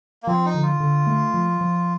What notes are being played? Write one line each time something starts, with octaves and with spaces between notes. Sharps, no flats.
A#3
F3 C4
D#4
D3
F4
D3
A3
F3
F3